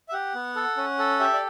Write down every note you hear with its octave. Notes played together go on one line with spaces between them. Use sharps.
E5
G4 F#5
B3
A4
C#4
A4
G4 E5
D5